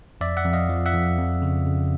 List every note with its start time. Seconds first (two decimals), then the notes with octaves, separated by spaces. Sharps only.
0.21 F2 D5 E5
0.37 E5 F#5
0.45 F2
0.53 D#5 F5
0.69 F3
0.86 E5 F#5
0.94 F2
1.18 F2
1.42 C#3
1.66 C#3